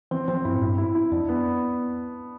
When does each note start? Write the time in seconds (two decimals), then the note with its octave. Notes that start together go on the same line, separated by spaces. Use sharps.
0.11 E3 C4
0.28 F3 C4
0.45 G2 E4
0.54 A2
0.62 G2 E4
0.78 E4
0.95 E4
1.12 F2 D4
1.29 B3